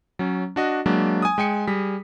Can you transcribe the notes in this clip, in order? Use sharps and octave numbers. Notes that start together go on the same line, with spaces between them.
F#3 C#4
D4 F#4 D#5
F#3 G#3 A#3 D4
G#5 D#6
G#3 G5 G#5 C#7
G3 G#4 B6